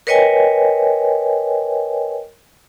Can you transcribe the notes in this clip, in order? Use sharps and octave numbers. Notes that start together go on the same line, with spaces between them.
A#4 B4 C#5 D#5 G5 G#5